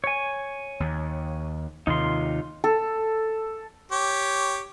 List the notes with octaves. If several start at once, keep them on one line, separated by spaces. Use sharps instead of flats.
C#5 G#5
D#2
D#2 C3 D#3 D#4 F4 C6
A4
G4 C#5